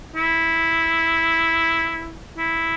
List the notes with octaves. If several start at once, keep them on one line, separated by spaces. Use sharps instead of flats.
E4
E4